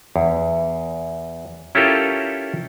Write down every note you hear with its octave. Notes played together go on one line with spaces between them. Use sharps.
E2
C#4 E4 F4 G4 A4 A#4